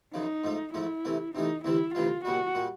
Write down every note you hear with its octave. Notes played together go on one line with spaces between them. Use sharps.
F#2 C#3 F3 D#4
G#2 F3 A3
G#2 F3 A3 E4
C3 E3 A3
C3 E3 A3 D#4
D2 C3 E3 G3 E4
D2 C3 E3 G3 F4
C2 A#2 G3 F#4
A#2 G3